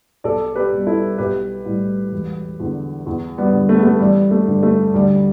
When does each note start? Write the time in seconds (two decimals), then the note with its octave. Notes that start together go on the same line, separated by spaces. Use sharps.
0.24 B1 A4 D5
0.56 G4 B4
0.72 B2 G3
0.87 E4 A4
1.18 B1 G4 B4
1.66 A2 G3
2.12 E1
2.60 E2 D3
3.06 E2
3.38 G3 B3
3.53 D3 G3
3.69 A3
3.77 B3
3.83 A3
4.00 A1 G3
4.31 A3
4.48 G2 D3
4.63 A3
4.94 D2 G3